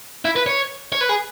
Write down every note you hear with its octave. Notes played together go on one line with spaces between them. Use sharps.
E4
B4
C#5
C#5
B4
G#4